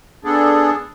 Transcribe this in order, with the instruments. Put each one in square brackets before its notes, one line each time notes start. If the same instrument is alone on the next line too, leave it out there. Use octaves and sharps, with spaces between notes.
[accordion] B3 D4 G#4 A4